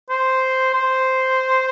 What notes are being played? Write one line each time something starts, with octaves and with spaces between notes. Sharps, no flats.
C5
C5